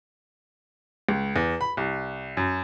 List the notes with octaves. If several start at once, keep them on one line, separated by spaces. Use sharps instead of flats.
C#2
E2
B5
C2
F#2